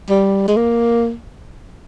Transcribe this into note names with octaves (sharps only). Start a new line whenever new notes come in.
G3
G#3
A#3